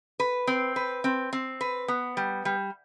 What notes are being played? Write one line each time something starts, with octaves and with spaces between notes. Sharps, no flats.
B4
C4
B4
C4
C4
B4
B3
G3
G3